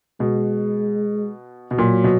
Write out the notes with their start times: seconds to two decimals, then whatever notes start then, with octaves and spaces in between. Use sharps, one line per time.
0.20 B2 G#3
1.71 B2
1.78 A#2 F#3
2.04 B2